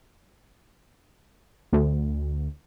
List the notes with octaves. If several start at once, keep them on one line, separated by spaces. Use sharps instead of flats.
D2